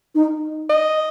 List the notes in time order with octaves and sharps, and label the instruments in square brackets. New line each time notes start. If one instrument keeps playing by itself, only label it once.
[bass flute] D#4
[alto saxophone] D#5